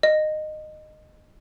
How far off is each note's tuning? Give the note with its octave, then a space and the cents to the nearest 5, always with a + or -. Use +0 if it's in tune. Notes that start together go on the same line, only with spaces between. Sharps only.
D#5 -15